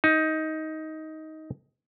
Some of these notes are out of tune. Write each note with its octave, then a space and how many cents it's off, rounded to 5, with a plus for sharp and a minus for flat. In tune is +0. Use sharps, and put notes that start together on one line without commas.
D#4 +15